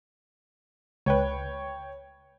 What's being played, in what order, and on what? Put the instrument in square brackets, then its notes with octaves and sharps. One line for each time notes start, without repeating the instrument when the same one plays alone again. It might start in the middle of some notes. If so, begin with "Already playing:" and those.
[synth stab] C#2 B4 [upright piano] C#5 G5